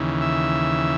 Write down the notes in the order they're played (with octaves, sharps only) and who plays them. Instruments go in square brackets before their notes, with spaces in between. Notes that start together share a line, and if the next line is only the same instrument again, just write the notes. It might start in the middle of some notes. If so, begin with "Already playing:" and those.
Already playing: [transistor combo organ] D#2 C#3 E3
E5